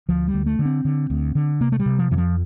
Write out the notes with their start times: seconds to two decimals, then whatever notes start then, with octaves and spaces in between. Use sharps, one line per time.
0.09 D2 F3
0.28 G3
0.34 D2
0.46 A3
0.59 D3
0.65 C4
0.85 D3
1.10 D2
1.35 D3
1.61 C3 A#3
1.72 A3
1.80 G3
1.86 C3
1.99 F3
2.11 F2 E3
2.18 F3